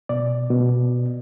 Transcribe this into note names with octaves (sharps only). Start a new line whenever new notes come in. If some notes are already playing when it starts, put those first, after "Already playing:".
B2 D5
B2